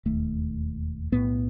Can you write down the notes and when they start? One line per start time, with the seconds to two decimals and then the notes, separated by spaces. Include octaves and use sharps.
0.05 E1 D#2 A3
1.12 B1 A2 B3